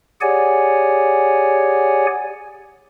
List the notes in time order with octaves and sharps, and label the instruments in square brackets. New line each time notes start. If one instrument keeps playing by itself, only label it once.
[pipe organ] G4 G#4 C#5 D5 F#5 G#5